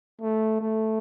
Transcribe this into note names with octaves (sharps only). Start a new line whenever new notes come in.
A3
A3